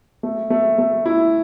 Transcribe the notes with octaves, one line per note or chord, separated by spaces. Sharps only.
A3
A3
A3
E4